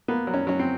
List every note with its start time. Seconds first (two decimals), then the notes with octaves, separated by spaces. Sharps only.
0.08 A#3 B3
0.27 F#3
0.34 C#4
0.47 F#3 C#4
0.60 C4